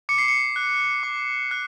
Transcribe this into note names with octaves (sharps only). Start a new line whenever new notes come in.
D6 C#7
C7
C#7
F#6
D6
F#6